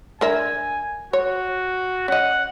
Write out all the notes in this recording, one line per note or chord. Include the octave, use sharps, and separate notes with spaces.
D3 A#4 E5 G#5
F#4 C#5
C#4 D#5 F#5